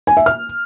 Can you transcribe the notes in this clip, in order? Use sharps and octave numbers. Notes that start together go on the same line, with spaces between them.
G#5
E5
F6